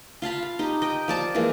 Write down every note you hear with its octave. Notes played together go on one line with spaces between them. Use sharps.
F4 F5 A5 B5
F5
D#4 G4
D#5 G5
F3 D5 A5
E3 F3 G#3 A#3